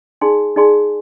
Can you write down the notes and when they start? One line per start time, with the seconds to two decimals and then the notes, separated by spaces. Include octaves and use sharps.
0.21 D#4 G#4 D5 G#5 C6
0.56 D#4 G#4 D5 G#5 C6